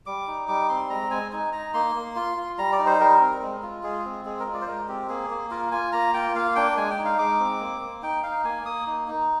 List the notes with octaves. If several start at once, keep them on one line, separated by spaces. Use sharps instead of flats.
G3 D6
D#4
G3 D6
C4 C6
G#3 A#5
G#3 G#5
D#4 G#5
D#4 A#5
A#3 C6
A#3
F4
F4
G3 A#5
D5
D#4
C5
G3 A#4
C4
G#3
F4
G#3 G#4
C4
G#3 G#4
A#4
F4
D5
C5
G#3 A#4
C4 G4
A#3 G#4
A#3
F4 A#4
F4 G#5
A#3 A#5
F4 G5
A#3 F5
D4 G5
G#3 G#5
G5
D#4
F5
G#3 D6
C4
A#3
A#3
D#4 G5
D#4 F5
A#3 G#5
A#3 D#6
D#4
D#4